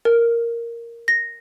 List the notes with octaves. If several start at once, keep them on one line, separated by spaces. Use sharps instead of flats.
A#4
A#6